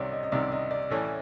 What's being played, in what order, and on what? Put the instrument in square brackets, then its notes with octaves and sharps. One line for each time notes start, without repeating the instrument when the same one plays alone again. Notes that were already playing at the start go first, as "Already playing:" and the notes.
Already playing: [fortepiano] C2 C3 D#3 [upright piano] C#5 D5
[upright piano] D#5
D#5
[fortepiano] C2 C3 D#3 [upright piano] D5
[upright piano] D#5
D5
[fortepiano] A2 E3 A3 C#4